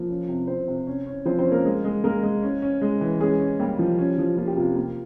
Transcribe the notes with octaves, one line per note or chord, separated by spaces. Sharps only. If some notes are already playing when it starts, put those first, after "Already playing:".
Already playing: F3 A#3
C#4
C3
C3 C4 C5
C3
C#4
C#4
F3 C4 C5
C4 C5
C#4
A#3 A#4
G#3
G#3
G#3 A#3 A#4
G#3
C#4
C#4
G#3
E3
G#3 C#4 G#4
C#4
G3 A#3 G4
F3
C#4
F3
A#3 F4
G4
C3 F4
A#3